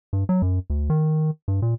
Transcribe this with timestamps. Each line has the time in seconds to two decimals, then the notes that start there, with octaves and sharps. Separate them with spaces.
0.13 G2
0.29 F#3
0.42 F#2
0.70 D2
0.90 D#3
1.48 G2
1.62 A#2